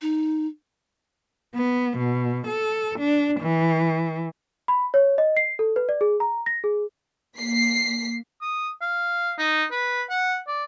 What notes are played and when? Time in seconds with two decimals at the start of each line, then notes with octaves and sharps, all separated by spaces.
0.02 D#4
1.55 B3
1.98 B2
2.47 A4
3.00 D4
3.41 E3
4.68 B5
4.94 C#5
5.18 D#5
5.37 C7
5.59 A4
5.76 B4
5.89 D5
6.01 G#4
6.20 A#5
6.46 A#6
6.64 G#4
7.36 A#3 B6 C7
8.42 D#6
8.81 F5
9.38 D#4
9.71 B4
10.10 F#5
10.47 D5